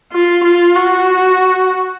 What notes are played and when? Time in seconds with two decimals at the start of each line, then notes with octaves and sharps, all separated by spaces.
0.13 F4
0.44 F4
0.75 F#4